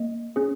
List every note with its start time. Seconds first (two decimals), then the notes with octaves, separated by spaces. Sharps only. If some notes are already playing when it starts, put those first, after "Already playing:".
Already playing: A#3 D#5
0.36 C#4 G#4